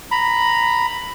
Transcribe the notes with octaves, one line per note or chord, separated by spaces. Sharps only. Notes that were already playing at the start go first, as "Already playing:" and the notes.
A#5 B5